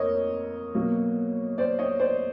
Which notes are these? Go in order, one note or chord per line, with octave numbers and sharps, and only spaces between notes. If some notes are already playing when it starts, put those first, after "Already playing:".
Already playing: F2 A#3 A#4 C#5 D#5
B2 F#3 A#3
C5 D5
C#5 D#5
C5 D5